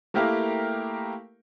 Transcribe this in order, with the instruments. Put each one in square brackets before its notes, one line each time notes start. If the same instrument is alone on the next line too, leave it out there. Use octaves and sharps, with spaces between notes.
[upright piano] A3 A#3 E4 G4 A#4 F5